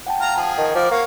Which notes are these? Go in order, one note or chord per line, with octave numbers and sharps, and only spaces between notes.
F#5 G5 A5
F4 A#5 F6
F3 G#4
D#3
F3 A#4 D5
A#3 C#5 F5 F#5